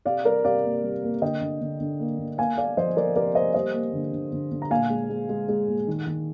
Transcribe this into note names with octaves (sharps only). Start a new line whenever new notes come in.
C3 D5 F5
G3 A#4 D5
C3 D5 F5
A#3
G3
A#3
D3 D#5 G5
D3
D3
D3
A#3
D3
A#3 F5 G#5
A#3 D5 F5
F3 C5 D#5
F3 A#4 D5
C3 A#4 D5
A#3 C5 D#5
G3 C5 D#5
A#3
D3
D3
D3
D3
A#5
A#2 F5 G#5
G#3
G#3
G#3
G#3
A#2
D#3
D#3